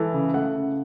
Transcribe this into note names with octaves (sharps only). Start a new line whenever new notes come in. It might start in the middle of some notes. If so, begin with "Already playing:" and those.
Already playing: E3 A4
C#3
A3 F#5
C#3